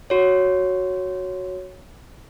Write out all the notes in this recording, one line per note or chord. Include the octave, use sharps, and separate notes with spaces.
F#4 C#5